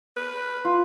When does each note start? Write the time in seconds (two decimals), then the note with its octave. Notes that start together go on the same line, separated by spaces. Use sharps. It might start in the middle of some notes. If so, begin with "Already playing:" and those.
0.17 B4
0.65 F4